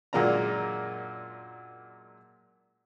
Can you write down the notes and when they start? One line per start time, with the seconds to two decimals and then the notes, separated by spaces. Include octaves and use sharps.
0.13 F#2 A#2 G#3 A#3 D4 A#5